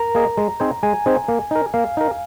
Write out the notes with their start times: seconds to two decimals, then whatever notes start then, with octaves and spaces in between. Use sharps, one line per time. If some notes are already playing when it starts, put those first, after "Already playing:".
Already playing: A#4 A#5
0.15 A#3 G#4 D#5
0.37 G#3
0.60 C4 D#4 G#4 C5
0.83 G#3 G#5
1.06 C4 D#4 G#4 C5
1.28 A#3
1.51 D#4 A#4
1.74 A#3 F5
1.97 D#4 A#4